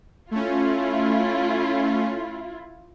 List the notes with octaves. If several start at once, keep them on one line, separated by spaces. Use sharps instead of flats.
A3 C#4 E4 F4